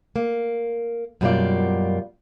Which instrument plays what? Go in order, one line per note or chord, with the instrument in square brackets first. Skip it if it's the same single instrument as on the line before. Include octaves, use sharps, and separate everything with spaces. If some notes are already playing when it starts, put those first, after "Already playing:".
[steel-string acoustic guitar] A#3
F#2 B2 G3 A#3 F4 D5